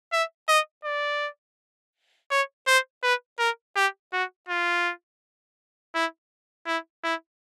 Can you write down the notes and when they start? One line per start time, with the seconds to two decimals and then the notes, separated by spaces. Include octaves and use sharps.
0.13 E5
0.49 D#5
0.85 D5
2.31 C#5
2.67 C5
3.03 B4
3.39 A#4
3.76 G4
4.13 F#4
4.49 F4
5.95 E4
6.67 E4
7.04 E4